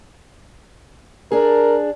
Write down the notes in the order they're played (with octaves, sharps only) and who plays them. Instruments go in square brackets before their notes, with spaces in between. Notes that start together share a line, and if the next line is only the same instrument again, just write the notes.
[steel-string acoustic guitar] D4 G#4 [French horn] A#4